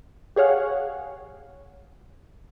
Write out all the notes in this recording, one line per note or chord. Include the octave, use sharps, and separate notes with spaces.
G4 G#4 C#5 F5 F#5